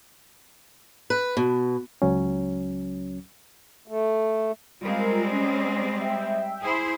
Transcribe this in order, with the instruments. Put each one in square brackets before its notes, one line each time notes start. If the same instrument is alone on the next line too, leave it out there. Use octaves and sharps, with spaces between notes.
[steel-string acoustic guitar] B4
B2
[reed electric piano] C#2 F#3 C#4
[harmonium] A3
[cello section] G3 G#3 C4 [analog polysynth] F4 A#4
[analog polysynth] C#4
E5 G5
[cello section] E4 G#4 C5